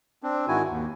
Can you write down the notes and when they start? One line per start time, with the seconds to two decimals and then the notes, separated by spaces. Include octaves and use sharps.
0.23 C4 D4
0.48 G#2 D#3 E4 F#4 G#5
0.69 D#2